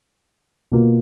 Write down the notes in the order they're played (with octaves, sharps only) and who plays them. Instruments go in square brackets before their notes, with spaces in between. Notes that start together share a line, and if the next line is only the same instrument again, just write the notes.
[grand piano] B2 A#3 F4